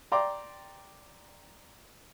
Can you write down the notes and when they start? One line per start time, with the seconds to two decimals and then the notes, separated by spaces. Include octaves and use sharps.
0.12 D5 G5 A#5 C6 D6